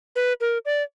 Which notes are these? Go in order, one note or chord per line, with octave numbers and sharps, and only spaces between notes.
B4
A#4
D5